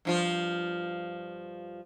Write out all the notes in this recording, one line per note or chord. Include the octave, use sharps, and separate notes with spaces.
G2 F3 F4